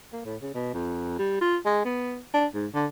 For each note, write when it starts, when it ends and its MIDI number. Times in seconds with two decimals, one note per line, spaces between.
0.13 0.22 58
0.25 0.36 45
0.42 0.51 49
0.54 0.71 47
0.74 1.17 41
1.19 1.39 55
1.41 1.57 65
1.66 1.84 56
1.85 2.20 59
2.34 2.46 62
2.54 2.67 44
2.74 2.86 50